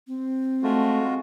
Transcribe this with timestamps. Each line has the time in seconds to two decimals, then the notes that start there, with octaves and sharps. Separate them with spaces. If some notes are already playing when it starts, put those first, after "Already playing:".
0.07 C4
0.63 G#3 A3 F4 F#4